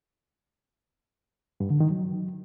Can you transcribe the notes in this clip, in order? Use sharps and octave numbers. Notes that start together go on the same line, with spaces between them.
G2
D3
D#3
F#3